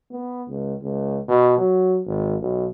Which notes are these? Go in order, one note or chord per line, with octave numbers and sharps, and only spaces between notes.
B3
C#2
C#2
B2
F#3
G#1
B1